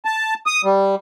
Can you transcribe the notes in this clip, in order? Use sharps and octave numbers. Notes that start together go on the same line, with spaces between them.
A5
D#6
G3